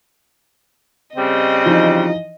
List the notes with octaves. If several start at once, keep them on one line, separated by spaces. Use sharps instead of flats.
C#3 G3 C4 D#5
E3 F3 D#4